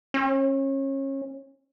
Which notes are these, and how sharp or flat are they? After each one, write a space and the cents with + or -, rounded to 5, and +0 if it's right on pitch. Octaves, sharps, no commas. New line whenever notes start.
C#4 -30